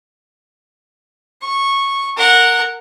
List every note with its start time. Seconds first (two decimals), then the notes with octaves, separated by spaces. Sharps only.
1.42 C#6
2.16 A#4 F#5